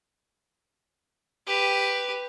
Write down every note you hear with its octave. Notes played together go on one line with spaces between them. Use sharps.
G4 B4